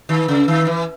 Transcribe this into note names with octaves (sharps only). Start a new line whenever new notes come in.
D#3
C#3
D#3
E3